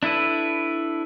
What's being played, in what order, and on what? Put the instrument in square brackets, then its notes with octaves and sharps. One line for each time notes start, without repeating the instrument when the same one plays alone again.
[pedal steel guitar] D4 E4 A4 B4